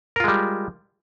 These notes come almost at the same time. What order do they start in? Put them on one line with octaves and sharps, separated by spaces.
A#4 F4 G#3 G3